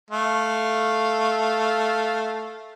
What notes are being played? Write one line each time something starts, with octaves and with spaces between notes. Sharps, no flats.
A3 F5